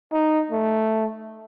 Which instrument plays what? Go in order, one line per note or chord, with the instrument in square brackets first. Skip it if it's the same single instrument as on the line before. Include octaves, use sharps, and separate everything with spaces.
[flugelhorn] D#4
A3